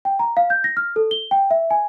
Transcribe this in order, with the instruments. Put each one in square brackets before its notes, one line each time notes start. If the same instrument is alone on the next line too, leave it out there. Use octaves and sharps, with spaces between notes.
[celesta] G5
A#5
F5
G6
A#6
F6
A4
G7
G5
E5
G#5